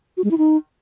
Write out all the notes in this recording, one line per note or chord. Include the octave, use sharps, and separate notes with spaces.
F#4
G#3
E4
D#4